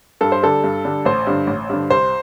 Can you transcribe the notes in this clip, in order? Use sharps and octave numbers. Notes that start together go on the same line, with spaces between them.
G2 A4
C5
D3 G3 A4
G2
D3 G3
A1 C5
G2 D3
A1
G2 D3
C2 C5